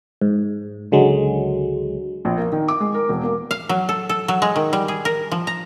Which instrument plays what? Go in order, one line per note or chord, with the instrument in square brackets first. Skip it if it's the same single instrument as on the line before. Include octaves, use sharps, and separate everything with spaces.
[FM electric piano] G#2
C#2 D3 F#3 G#3
[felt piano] A#1
A#3
D#3
D6
G#3
A#4
E1
A#3
[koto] F5
F#3
A4
A4
F#3
G#3
D#3
G3
G#4
A#4
F3
A#5